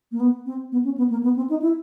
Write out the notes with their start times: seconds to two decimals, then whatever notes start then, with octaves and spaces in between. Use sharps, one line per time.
0.12 A#3
0.20 B3
0.46 C4
0.72 B3
0.85 C#4
0.98 B3
1.10 A#3
1.24 B3
1.36 C4
1.50 D#4
1.62 E4